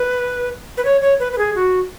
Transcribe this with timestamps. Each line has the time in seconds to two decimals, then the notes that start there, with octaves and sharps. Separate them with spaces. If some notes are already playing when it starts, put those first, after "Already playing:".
Already playing: B4
0.77 B4
0.85 C#5
1.02 C#5
1.20 B4
1.32 B4
1.38 G#4
1.55 F#4